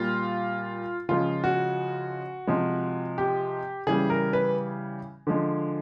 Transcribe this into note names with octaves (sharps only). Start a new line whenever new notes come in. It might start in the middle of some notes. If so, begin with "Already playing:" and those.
Already playing: A#2 G3 F4
C#3 F3 G#3 F4
F#4
C3 F3 G#3
G4
C#3 E3 G3 G#4
A#4
B4
D3 F3 G#3